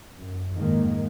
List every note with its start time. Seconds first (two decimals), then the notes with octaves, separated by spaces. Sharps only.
0.18 F#2
0.53 F2 G#2 D#3 G#3 A#3